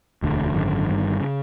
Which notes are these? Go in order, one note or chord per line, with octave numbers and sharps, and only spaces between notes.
E1 D2 D3
G#1 F#2 D3
G1 G2 D#3
C#3